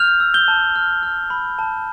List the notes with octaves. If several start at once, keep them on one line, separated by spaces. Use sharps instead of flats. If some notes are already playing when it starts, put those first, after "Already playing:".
Already playing: F6 G6 F7
E6
G6 G7
A5
F6
F6
B5
A5